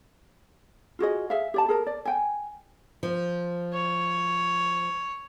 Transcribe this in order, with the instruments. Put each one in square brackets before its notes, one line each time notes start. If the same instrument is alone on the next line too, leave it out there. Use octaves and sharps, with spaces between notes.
[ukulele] F4 F#4 G#4 D#5
G#4 E5 F5
G4 D5 A5
G#4 A#4 A5
D5
G5 G#5
[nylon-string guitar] F3
[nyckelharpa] C#5